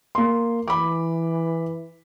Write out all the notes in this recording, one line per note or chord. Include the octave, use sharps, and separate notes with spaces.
A#3 C6
E3 B5 D6